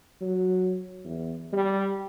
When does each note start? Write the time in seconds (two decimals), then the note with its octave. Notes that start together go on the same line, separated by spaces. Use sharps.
0.21 F#3
1.05 E2
1.53 G3